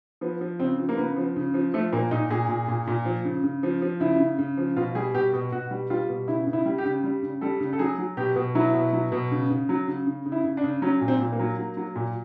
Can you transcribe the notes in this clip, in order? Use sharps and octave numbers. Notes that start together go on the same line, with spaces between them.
F3 B3
F3
C#3 C4
F3
A#3
C#3 B3
F3
C#3
F3
F3 A3
A#2 A#3
A#2 D#4
A#2 G#4
A#2
A#2
A#2
F3
C#3
C#3
F3
F3
C#3 E4
C#3
C#3
F3
B2 F4
G3 G#4
B2 G4
B2
B2 F#4
G3
G3 F4
B2
C#3 E4
C#3
E4
G3
G4
C#3
G3
C#3
G3 A4
C#3
A4
F#3 G#4
F#3
B2 G4
B2
F#3 E4
B2
F#3
B2
C#3
C#3
F#3
C#3
C#3
C#3
E4
C#3
D4
C#3
F#3 C#4
A#2
C4
A#2
A#3
F#3
F#3
F#3
A#2